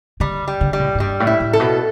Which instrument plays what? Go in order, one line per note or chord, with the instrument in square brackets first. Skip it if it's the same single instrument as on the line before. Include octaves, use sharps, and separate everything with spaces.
[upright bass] D3 [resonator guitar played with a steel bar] G3
[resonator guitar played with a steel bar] G3
[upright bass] D3
[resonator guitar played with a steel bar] G3
[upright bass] A2
A2
[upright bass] G2 [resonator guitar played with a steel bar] G3
[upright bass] A2
[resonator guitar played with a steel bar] E4
[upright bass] A2
[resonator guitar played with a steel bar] A4
[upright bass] B2